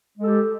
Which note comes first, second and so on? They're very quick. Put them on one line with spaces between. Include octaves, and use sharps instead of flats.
G#3 A4 G4